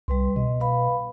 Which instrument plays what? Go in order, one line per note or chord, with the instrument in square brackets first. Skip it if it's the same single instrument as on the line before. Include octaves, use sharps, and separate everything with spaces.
[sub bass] C2 [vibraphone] G3 B4 C6
[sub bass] B2 [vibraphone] D#5
[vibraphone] B4 F5 B5